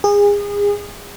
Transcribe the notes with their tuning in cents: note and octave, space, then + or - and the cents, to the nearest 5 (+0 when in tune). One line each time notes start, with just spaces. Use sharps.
G#4 -30